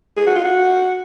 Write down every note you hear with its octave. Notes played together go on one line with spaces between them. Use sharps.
G#4
F#4
F4
F#4